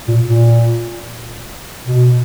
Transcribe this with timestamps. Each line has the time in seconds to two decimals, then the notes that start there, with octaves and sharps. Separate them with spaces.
0.08 A#2
0.25 A#2
1.86 B2